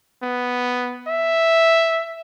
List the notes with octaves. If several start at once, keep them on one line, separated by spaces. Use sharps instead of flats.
B3
E5